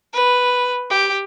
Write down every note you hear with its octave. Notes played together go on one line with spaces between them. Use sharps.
B4
G4